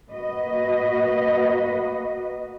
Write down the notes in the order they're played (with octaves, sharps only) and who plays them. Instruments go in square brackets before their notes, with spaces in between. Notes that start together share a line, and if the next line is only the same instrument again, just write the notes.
[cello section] A#3 F#4 B4 D#5